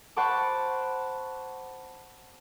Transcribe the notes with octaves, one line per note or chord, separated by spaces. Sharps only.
C5 F#5 A5 B5 C#6 D6